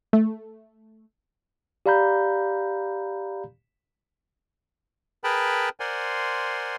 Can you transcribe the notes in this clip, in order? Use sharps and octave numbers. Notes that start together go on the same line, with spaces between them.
A3
G4 D5 F5 A#5 B5 G6
G#4 A#4 B4 G5 A5 B5
A#4 C5 D5 F#5 G#5 C6